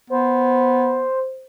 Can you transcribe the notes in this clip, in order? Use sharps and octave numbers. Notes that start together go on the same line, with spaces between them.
B3 C5